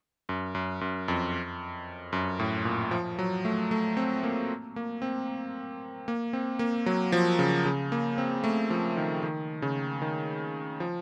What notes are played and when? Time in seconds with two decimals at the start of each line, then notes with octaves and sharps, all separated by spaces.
0.29 F#2
0.55 F#2
0.81 F#2
1.08 F2
2.13 F#2
2.40 A2
2.65 A#2
2.91 F3
3.19 F#3
3.45 A3
3.71 A3
3.97 C4
4.23 A#3
4.76 A#3
5.02 C4
6.08 A#3
6.33 C4
6.59 A#3
6.86 F#3
7.12 F3
7.39 C#3
7.65 C#3
7.92 A#3
8.18 C4
8.44 A3
8.70 F3
8.97 D#3
9.23 D#3
9.62 C#3
10.02 D#3
10.80 F3